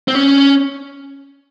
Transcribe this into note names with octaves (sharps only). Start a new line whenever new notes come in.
C4
C#4